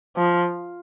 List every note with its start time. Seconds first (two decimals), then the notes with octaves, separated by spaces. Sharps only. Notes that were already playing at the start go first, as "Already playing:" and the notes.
0.16 F3